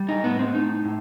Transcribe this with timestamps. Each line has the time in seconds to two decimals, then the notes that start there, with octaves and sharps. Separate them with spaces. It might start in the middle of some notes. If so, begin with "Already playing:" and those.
Already playing: G3
0.09 D#4
0.24 A2 B3
0.39 C4
0.55 A2 D#4
0.85 A2